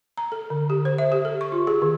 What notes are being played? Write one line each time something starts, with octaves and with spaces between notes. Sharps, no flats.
A#5
A4
D3
G4
C5
E5
G4
A4
C#6
F4
G#4
D#3